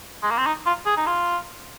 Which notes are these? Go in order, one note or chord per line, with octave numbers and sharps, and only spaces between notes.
G#3
A#3
C4
D#4
F4
G#4
D#4
F4